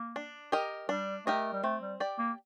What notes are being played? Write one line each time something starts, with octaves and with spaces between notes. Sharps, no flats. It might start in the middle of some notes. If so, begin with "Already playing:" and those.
Already playing: A#3
D4
G4 A#4 D#5
G3 D4
A3 G4 A#4 D#5
G3
A3 C4
G3
G4 D5
A#3